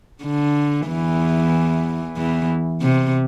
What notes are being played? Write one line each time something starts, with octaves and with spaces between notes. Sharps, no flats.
D3
E2 E3
E2 E3
C3